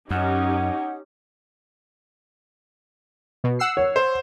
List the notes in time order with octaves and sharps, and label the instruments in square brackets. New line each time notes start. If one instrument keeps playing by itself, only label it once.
[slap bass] F#2 [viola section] C#4 D#4 G4 [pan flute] F#5
[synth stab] B2
F#5 E6 C7
[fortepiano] C#5
[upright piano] C5